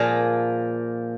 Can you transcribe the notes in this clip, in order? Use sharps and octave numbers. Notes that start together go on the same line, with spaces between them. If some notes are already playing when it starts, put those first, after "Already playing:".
Already playing: A#2 F3 A#3 G#4